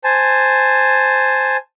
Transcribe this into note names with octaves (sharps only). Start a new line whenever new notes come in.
C5 G#5 A5